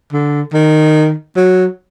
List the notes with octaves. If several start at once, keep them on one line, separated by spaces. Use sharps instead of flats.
D3
D#3
F#3